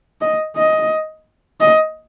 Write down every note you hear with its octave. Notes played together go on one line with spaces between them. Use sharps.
D#5
D#5
D#5